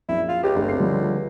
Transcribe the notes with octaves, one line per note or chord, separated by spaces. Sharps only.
A#1 F#2 E4
F4
C#2 G4
G1 A3
C4 C7
D3 F3 G3